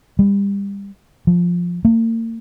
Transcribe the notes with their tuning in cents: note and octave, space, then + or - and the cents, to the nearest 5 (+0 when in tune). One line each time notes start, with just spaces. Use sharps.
G3 +30
F3 +5
A#3 -45